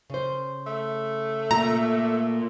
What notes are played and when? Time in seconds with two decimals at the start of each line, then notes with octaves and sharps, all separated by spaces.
0.10 C#3 C5
0.67 A3
1.51 A#2 A#5